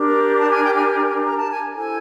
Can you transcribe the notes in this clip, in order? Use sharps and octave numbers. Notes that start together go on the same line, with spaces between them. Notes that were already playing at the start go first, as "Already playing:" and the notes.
Already playing: D4 G4 A#4
A5
G#5
G5
G#5
A#5
A5
G#5
E4 A4 C5 G#5